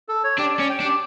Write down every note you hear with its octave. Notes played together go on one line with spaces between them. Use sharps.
A4
C#5
D4 G4
D5
C#4
G5
D4
G4